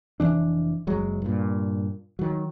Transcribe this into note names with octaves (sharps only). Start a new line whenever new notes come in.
F1 F2 E3 D4
F#1 F#3 G#3
G2 A#2
D#3 F#3